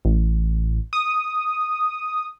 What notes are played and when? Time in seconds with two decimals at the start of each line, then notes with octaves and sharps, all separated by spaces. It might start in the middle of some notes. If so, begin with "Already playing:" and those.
0.05 A1
0.93 D#6